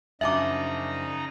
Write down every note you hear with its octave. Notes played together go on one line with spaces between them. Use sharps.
F#2 C#3 F3 D4 D#4 E5 A#5 D6